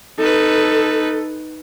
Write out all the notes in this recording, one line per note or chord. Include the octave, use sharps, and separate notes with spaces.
D#4 A4 B4